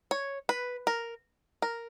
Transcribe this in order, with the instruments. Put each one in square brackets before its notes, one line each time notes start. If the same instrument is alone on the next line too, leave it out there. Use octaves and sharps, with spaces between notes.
[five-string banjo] C#5
B4
A#4
A#4